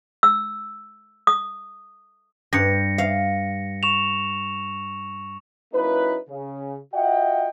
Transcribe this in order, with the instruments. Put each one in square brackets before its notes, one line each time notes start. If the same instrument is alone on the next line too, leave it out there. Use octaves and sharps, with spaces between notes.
[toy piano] E6
D#6
[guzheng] G2 [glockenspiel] A#6 C#7
[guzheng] F5
[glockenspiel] C#6 E7 F7
[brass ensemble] F#3 A#3 C#4 D#4 E4 B4
C#3
F4 F#4 D#5 E5 F#5 G5